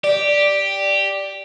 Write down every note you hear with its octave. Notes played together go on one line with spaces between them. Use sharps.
G4 D5